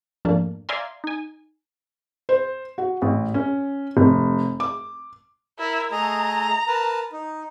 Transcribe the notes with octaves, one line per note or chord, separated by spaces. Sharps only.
F2 G#2 F3 A3 A#3 D4
D5 E5 F5 G#5 A#5 C6
D#4 G#5
C5
F#4
A1
C#4
F1
D6
E4 A#4
A3 G#4 D#5 A#5
A#4 B4 A5
D#4